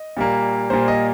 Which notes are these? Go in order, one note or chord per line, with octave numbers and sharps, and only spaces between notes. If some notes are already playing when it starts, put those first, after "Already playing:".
Already playing: D#5
A#2 G3 A#3
A#2 G3 A#3 C5
D#5